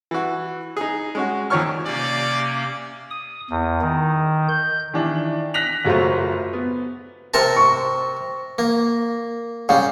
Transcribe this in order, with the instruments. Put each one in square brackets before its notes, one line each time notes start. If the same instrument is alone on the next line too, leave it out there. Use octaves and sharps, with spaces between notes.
[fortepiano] E3 F#4
D#4 G#4
G#3 C#4 F#4
D#2 D#3 F3 C#5 C#6 F6
[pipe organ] C3 A#3 C#4 [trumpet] D5
[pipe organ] D#6
E2
D#3
G6
[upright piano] D#3 E3 D4
F#6 A#6 B6 F7
F#1 F#3 A3 F4 C5
B3
[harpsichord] C3 A#4 A5
[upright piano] C#6
[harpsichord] A#3
[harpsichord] C#3 G3 [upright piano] F5